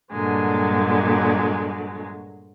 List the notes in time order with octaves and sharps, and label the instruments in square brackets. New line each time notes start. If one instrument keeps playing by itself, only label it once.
[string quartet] G2 A#2 D3 F#3 G#3